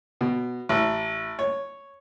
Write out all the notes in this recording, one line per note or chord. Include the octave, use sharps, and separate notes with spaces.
B2
A1
C#5